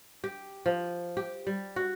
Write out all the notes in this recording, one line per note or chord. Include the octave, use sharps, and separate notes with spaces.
G4
F3
G4
G3
F#4